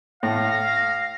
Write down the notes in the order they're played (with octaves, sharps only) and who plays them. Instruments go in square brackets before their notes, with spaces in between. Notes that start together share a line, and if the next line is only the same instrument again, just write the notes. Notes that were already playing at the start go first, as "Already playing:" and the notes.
[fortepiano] A2 [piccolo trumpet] F5 [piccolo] A#6